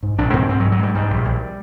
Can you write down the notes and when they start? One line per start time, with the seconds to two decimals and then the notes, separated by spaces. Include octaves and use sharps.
0.03 G#2
0.18 A#1 D4
0.33 G#2 C4
0.49 G#2 C4
0.60 F#3
0.65 G#2
0.72 F#3
0.79 G#2 G3
0.95 G#2 G3
1.10 A#1
1.25 A#1